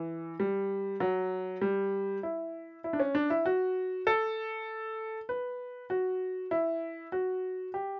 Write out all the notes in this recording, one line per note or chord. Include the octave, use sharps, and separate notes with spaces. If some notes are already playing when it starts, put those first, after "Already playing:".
Already playing: E3
G3
F#3
G3
E4
E4
D4
C#4
D4
E4
F#4
A4
B4
F#4
E4
F#4
G4